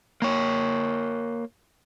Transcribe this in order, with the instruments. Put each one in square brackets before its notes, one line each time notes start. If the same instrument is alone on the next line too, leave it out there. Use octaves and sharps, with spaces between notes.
[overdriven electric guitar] A#3 C#5